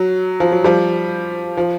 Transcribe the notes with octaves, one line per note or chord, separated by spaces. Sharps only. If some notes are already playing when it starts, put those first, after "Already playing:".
Already playing: F#3
F3
F#3
F3 G3
F3